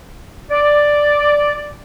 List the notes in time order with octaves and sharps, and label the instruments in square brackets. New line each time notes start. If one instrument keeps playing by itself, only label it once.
[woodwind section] D5